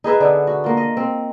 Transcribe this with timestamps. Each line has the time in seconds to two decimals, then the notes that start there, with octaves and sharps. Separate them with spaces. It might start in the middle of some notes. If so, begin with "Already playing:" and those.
0.04 D#4 G#4 B4 E5
0.20 D3 B3 D4
0.47 F#4
0.64 A#3 F4
0.77 D#5
0.97 C4